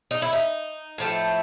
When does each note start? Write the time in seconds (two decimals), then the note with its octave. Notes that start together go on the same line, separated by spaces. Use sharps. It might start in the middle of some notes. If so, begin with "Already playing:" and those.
0.11 D#4
0.22 E4
0.33 D#4
0.98 A2 F3 A3